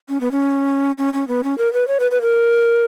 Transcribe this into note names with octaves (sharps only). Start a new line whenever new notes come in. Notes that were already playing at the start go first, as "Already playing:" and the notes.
C#4
B3
C#4
C#4
C#4
B3
C#4
A#4
B4
C#5
B4
B4
A#4